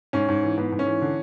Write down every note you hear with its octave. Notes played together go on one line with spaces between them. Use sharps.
G#2 C#4
G#2
E3
G#2 B3
G#2
C#4
E3
D3